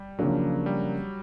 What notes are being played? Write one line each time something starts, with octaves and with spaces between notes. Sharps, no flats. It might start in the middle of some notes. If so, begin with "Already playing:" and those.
Already playing: G3
C#3 F3 F#3 A#3 D4
G3